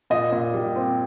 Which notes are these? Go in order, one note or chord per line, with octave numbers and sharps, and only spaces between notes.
A#2 D#5
A#2
G3
C4